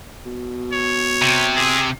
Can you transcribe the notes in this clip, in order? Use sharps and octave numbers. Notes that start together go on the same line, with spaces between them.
B2
C#5
C3
G#4